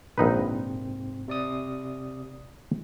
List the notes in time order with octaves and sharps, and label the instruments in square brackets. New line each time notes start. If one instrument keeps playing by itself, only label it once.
[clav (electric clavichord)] A#1 D#4 B4 [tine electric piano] G#2 C3 C4
[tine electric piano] C3 D5 D#6